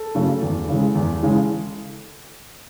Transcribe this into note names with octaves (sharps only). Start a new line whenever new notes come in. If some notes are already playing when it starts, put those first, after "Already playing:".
Already playing: A4
C#3 F#3 A3
E2
C#3 E3 G#3
E2
C#3 E3 G#3